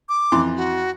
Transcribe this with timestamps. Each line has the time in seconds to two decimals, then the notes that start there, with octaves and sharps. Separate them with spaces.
0.09 D6
0.32 F2 E3 C6
0.56 F#4